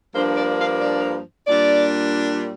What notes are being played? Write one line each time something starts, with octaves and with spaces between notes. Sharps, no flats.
G2 F3 A#3 D4 C5
D5
F5
D5
A#2 G3 D4 D5